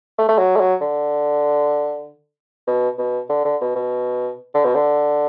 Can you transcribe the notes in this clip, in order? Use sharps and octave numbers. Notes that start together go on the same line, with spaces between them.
A3
A3
F#3
A3
F#3
D3
B2
B2
D3
D3
B2
B2
D3
B2
D3